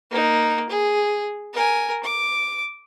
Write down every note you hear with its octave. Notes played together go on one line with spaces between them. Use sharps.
A#3 D#4
G#4
A#4 G#5
D6